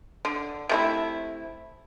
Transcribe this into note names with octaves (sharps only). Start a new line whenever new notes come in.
D3
C3 A3 E4